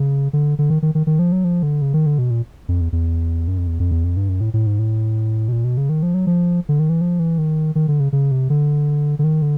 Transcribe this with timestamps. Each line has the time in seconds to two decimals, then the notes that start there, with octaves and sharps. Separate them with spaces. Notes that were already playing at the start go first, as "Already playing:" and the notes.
Already playing: C#3
0.33 D3
0.59 D3
0.70 D#3
0.82 D#3
0.95 D#3
1.07 D#3
1.19 F3
1.32 F#3
1.44 F3
1.63 D3
1.82 C#3
1.94 D#3
2.06 D3
2.19 B2
2.31 A#2
2.68 F2
2.81 E2
2.92 E2
3.48 F#2
3.58 F2
3.67 E2
3.80 F2
3.91 E2
4.04 F2
4.17 G2
4.29 F#2
4.41 A2
4.54 A2
4.67 G#2
4.79 A2
5.48 B2
5.52 A#2
5.64 B2
5.77 C#3
5.89 D#3
6.03 F3
6.14 F#3
6.27 F3
6.69 D3
6.79 D#3
6.90 E3
7.01 F3
7.19 E3
7.38 D#3
7.75 D#3
7.88 D3
8.00 C#3
8.13 C#3
8.31 C3
8.50 D3
9.19 D3
9.24 D#3
9.42 D3